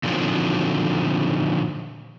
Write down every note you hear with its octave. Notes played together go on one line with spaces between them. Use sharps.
A#2 D3 D#3 F3 F#3 C4